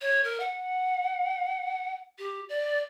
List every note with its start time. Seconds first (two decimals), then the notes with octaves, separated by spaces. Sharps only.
0.01 C#5
0.24 A#4
0.40 F#5
2.18 G4
2.49 D5